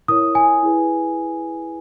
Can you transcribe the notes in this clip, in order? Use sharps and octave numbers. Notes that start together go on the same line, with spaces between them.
E4 A#4 C#5 D#6
G#5
E4 G#4 B4